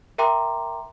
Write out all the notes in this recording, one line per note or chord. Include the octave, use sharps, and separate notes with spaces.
A#4 E5 G5 A#5 C6 D6